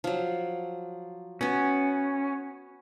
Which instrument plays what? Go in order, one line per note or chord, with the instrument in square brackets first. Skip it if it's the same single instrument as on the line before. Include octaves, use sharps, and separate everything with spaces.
[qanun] F3 F#3
[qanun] B3 F#4 [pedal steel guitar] C#4